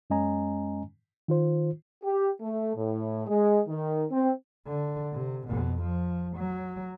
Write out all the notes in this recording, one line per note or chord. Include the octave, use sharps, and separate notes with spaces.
F#2 G#3 C#4 D#5 G#5 A#5
D#3 F4 C5
G4
A3
A2
G#3
D#3
C4
D3
C3
F2 B2
F3
F#3